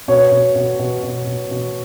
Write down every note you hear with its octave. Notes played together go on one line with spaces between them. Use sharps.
B2 C#5
B2
B2
B2
B2
B2
B2